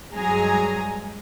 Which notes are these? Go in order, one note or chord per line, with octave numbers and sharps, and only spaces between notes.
G2 F#3 G#3 G#4 G#5 A#5